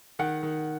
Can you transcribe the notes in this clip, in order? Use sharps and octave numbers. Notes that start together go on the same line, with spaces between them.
D#3 F#5
D#3